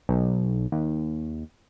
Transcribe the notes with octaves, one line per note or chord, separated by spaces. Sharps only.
B1
D#2